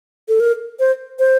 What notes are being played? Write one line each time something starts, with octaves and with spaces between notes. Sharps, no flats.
A4
A#4
C5
C5